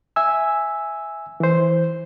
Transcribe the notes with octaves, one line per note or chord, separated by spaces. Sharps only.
E5 G#5 E6
E3 C5